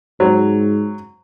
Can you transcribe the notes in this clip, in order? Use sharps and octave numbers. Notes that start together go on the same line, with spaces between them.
G#2 F#3 C4